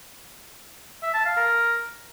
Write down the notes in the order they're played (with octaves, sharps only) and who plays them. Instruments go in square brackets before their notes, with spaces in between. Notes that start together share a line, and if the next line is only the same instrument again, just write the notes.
[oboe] E5
A5
F5
A#4